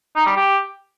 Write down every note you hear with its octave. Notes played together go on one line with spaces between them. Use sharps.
D#4
G3
G4